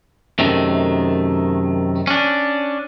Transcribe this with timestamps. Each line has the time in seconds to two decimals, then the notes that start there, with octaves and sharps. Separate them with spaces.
0.39 F#2 C3 D#3 A3
2.07 C#4 D4